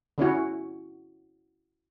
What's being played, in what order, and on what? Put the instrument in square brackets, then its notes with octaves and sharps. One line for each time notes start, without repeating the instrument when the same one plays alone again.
[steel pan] D3 C#4 E4 F#4